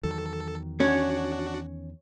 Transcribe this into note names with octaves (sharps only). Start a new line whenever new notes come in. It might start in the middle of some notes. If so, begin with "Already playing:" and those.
E2 D#3 F#3 A4
C#4 D4 F#4 C#5